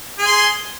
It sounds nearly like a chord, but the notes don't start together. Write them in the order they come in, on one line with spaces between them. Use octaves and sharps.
G#4 G#5 C6